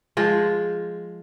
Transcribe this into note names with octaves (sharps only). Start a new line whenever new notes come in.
F3 G#3